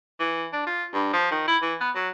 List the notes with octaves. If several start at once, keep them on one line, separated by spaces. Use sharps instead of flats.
E3
D4
F4
G2
F3
D#3
E4
E3
B3
F#3